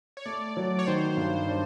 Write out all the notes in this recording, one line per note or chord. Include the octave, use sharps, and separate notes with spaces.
C#5
A3 D5
F#3
C#5
D#3 C5
G2
D4